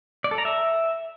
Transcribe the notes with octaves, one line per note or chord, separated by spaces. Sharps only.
D5
A4
A#5
E5